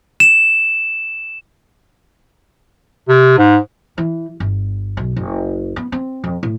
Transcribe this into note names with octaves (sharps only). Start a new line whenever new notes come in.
E7
C3
G#2
E3
G1
B1
F#1
B3
C4
F2
A2